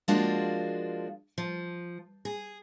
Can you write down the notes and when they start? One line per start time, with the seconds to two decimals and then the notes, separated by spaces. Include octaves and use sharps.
0.08 F3 G#3 A#3 D4 F4 F#4
1.38 F3
2.25 G#4